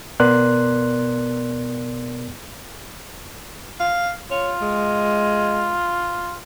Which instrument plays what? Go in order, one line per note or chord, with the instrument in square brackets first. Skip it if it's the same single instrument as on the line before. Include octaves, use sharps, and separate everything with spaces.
[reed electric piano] B2 B3 A#4 D5 C6 F#6
[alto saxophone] F5
[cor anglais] F4 [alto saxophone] C#5
[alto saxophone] G#3